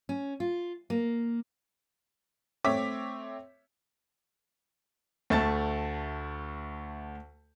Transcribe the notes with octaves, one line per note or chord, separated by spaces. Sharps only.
C#4
F4
A#3
A3 C4 C#5 E5 D6 B6
D2 A3 A5 A6